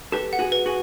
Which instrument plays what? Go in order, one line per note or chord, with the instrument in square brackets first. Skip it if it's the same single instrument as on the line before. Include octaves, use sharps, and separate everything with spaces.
[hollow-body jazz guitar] G4 A4 [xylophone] B4
[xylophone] F#5
[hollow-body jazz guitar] F#4 G#4
[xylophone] B4
[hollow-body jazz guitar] F#4 G#4